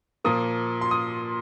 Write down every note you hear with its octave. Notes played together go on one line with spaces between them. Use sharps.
A#2 F3 A#3 D#6
C6
D#6